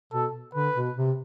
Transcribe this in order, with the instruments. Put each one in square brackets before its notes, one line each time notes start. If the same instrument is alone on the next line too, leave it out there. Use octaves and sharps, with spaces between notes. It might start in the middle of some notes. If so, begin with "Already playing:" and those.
[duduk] B2 [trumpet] A4
[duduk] D3 [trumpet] B4
[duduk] B2
C3